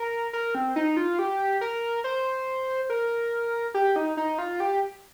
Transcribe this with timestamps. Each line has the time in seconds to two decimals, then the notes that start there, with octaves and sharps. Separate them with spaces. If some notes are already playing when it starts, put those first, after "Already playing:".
Already playing: A#4
0.33 A#4
0.55 C4
0.76 D#4
0.97 F4
1.19 G4
1.61 A#4
2.04 C5
2.90 A#4
3.74 G4
3.96 D#4
4.17 D#4
4.38 F4
4.60 G4